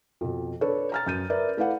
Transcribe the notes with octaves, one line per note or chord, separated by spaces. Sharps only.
F2 B2
D4 A4 B4 C#5
A#5 F6 A6
F#2 G6 D#7
A#4 B4 D5 E5
A3 E4 B4 D5 F5 F#5